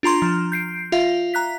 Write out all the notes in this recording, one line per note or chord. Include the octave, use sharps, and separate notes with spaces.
D4 F4 A#5 C6 A6
F3
G6 C7 D7
F4 E5 F5
A#5 F#6 B6